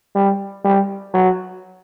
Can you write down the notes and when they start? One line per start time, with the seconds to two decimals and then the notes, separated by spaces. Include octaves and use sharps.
0.15 G3
0.65 G3
1.14 F#3